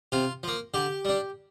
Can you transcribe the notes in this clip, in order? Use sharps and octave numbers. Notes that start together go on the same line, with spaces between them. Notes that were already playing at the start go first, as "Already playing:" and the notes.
C3 F4
F3 A#3
D3 G4
G3 D4